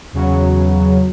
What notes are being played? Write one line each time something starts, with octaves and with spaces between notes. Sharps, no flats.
E2 C#3 F#3